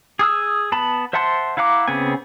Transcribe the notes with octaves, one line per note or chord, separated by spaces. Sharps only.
G#4 D#6 E6
B3 A5 B5
C5 E5 F#5 A5 C6
E4 F5 F#5 A#5 D6
C#3 B3 C4 G#5